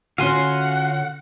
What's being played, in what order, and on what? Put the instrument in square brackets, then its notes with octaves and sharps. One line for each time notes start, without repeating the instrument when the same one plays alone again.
[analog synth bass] D3 [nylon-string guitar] C#4 F4 F#4 [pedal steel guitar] F5 G#5 C6 [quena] F#5